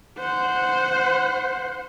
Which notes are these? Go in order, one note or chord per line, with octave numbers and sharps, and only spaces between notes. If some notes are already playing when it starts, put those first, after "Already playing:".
C5 F#5